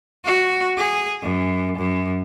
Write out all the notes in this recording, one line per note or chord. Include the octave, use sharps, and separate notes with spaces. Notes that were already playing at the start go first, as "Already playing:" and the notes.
F#4
G#4
F#2
F#2